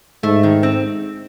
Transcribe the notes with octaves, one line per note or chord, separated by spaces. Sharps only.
G#2 A3
D#3
C4